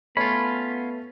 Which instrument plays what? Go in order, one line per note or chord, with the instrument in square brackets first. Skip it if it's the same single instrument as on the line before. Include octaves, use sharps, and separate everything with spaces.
[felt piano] A3 B4 C#5 [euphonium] B3 [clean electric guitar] C#4 F4 [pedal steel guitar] B5